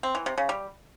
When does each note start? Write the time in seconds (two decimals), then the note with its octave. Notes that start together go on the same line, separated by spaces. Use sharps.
0.03 C4
0.15 E3
0.26 C3
0.38 C#3
0.49 G3